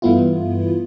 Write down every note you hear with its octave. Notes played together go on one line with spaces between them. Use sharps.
G2 E3 A3 B3 E4 F4